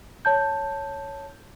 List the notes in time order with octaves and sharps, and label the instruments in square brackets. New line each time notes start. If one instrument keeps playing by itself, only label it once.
[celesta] C#5 A5 G6